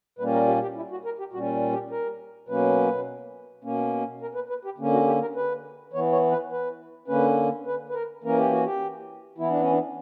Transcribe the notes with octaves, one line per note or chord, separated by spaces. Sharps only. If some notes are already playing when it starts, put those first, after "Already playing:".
A#2 G3 A#3 C#4 B4
A#4
G4
G4
E4
F#4
A#4
G4
A#2 G3 C#4 F#4
G4
A#4
B2 F#3 A#3 C#4 B4
B2 A#3 C#4
A#4
B4
B4
G4
D3 A#3 C#4
F#4
G4
A#4
B4
E3 B3 C#5
C#5
B4
B4
D3 A#3 C#4 B4
B4
B4
A#4
E3 A#3 C#4 A#4
G4
F#4
G4
E3 B3 E4
D4
C#4
D4